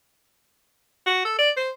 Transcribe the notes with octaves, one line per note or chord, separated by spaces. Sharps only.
F#4
A4
D5
C5